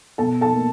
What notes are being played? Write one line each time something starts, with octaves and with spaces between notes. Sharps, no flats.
B2 A4 A5
A4 A5
A#3